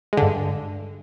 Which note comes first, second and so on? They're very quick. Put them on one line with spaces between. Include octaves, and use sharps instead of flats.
G#3 D3 G2